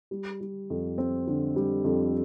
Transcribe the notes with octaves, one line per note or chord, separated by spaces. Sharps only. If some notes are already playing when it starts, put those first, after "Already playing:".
G3
G3
F2
C4
D3
G3
F2